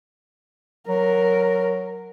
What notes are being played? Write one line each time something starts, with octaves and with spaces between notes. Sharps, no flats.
F#3 A#4